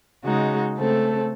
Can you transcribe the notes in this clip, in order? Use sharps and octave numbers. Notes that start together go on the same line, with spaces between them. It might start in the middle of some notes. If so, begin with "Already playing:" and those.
C#3 G#3 D#4 F#4
C#3 A3 C4 A4